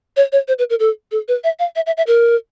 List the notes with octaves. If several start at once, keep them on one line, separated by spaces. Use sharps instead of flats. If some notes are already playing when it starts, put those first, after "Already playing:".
C#5
C#5
C5
B4
A#4
A4
A4
B4
E5
F5
E5
E5
E5
A#4